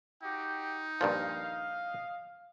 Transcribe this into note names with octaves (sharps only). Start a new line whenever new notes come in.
D#4 F#4 G4 G5
G2 A#2 F3 D#5 F5